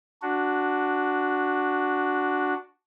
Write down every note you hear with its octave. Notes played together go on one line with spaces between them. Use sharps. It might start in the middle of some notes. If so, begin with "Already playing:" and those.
D4 F#4